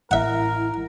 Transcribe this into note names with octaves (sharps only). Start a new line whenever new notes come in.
A1 E4 A#4 E5 F#5